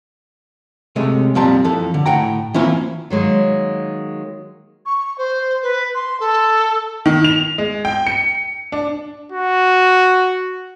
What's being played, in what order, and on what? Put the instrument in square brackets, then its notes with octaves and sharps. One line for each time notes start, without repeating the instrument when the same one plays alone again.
[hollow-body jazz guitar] C3 G#3 A3 C#4
F2 A#2 G3 C4 A5 A#5
F2 E3 A4
D3
A2 F#5 G5 A#5
E3 A#3 C4 C#4 E4 F4
[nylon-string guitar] D#3 F#3 G#3 A#3
[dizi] C#6
C5
B4
C6
A4
[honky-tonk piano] D#3
F7
G#3
G5
C#7
D4
[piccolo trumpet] F#4